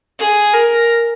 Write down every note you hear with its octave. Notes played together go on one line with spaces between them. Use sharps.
G#4
A#4